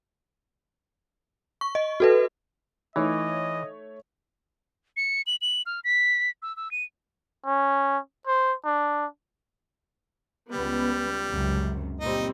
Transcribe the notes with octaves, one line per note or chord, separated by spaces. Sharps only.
C#6
D#5
F#4 A4 B4
E3 A3 D#4 C#5 D#5
C#7
F#7
F#7
F6
B6
E6
E6
D#7
C#4
C5
D4
C#2 G3 B3
C#2 F#2 C3
A#2 G3 C4 D#4 D#5